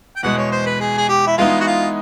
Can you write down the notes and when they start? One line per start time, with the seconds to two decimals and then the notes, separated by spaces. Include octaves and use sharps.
0.16 G5
0.23 E2 B2 G#3 F#5
0.37 C#5
0.52 C5
0.66 B4
0.80 G#4
0.98 G#4
1.09 G4
1.27 E4
1.38 E3 G#3 B3 D#4 F4
1.60 F#4
1.67 F4